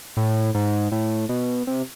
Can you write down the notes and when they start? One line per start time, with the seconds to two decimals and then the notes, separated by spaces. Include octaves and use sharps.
0.17 A2
0.55 G#2
0.92 A2
1.29 B2
1.67 C3